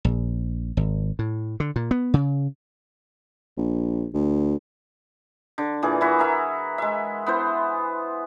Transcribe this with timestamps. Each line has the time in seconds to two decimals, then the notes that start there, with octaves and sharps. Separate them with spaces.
0.05 A#1
0.77 G#1
1.19 A2
1.60 D3
1.76 A#2
1.91 B3
2.14 C#3
3.57 A#1
4.13 D2
5.58 D3
5.82 A#2 E3 G#4
6.01 E3 E4 F#4 E5
6.19 G#4 A#4 E5
6.78 G#3 E5
7.26 B3 E4 C5